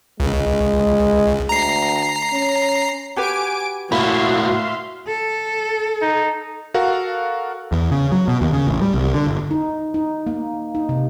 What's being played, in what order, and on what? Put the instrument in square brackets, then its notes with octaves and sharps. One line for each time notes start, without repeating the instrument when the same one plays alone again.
[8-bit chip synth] C#2 [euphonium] G#3
[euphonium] D2 [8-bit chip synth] A#5 C7
[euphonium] C#4
[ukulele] F#4 G4 B4 [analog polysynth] G#5 D6 D7
[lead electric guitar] A2 A#3 [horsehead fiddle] F#4 [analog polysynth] E5 F5 C6 [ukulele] B5
[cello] A4
[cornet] D#4
[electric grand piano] F#4 A4 A#4 F5 F#5
[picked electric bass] E2
C#3
F#3
B2
D#2
C#3
A1
G3
C2
D3
G1
[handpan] D#4
D#4
A#3
D#4
C3